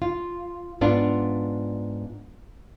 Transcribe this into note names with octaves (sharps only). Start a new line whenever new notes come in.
F4
G#2 B3 D4 F4